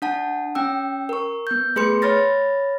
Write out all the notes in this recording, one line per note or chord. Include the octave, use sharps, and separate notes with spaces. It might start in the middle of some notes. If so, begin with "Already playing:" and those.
D4 F#5 A5
C#4 G5 E6
A#4 C#6
B3 G6
A3 G#4 B4 C6 C#7
C#5 B5 F6 A6 A#6